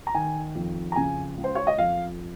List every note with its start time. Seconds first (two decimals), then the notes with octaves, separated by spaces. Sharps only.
0.07 A#5
0.14 D#3 G#5
0.55 F2
0.92 A#5
0.96 C#3 G#5
1.37 C#2
1.44 C5
1.55 C#5
1.67 D#5
1.78 F2 F5